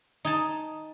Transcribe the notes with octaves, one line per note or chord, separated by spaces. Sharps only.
D#4 G#5 A5